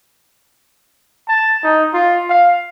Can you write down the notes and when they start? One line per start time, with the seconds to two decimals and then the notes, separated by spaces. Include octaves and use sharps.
1.28 A5
1.64 D#4
1.94 F4
2.30 F5